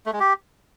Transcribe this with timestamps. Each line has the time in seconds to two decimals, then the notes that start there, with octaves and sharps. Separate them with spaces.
0.06 A3
0.13 G#3
0.20 G4